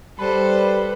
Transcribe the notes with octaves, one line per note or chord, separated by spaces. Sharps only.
G3 A4 B4 C5